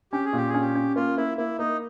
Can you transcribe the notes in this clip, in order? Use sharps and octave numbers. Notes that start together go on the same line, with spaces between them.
C#4 G4
G#4
A#2 G4
G#4
C#4
G4
C#4
A#3 F4
A#3 E4
A#3 E4
A#3 D#4